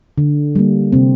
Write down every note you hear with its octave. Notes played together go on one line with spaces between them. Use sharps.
D3
G3 A#3
C3 C4